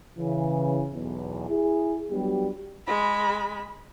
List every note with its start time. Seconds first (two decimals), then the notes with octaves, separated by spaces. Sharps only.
0.18 C#3 E3
0.93 B1 E2
1.49 E4 G#4
2.10 F#3 G3 B3 D4 G4
2.87 G#3 B5